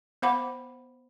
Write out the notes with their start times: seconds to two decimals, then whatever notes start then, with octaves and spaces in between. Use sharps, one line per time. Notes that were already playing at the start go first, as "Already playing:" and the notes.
0.22 B3 C5 F5 F#5 B5 D6